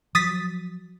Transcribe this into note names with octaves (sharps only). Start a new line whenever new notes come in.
F3 F#3 D#6 A6 B6